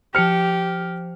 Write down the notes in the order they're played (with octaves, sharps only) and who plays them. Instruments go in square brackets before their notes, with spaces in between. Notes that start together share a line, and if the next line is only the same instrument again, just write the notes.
[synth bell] F3 C5 [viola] G4 [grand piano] F6 C#7